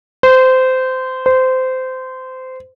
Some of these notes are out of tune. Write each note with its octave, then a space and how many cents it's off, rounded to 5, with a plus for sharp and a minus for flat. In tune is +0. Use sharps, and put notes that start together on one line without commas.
C5 -20
C5 -20